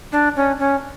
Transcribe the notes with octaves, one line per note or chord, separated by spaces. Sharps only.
D4
C#4
C#4